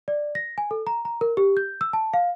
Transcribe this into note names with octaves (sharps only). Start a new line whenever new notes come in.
D5
A#6
G#5
A4
A#5
A#5
A#4
G4
G6
E6
A5
F5